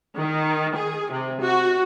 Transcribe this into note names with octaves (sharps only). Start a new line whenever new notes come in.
D#3
G#4
C3
F#4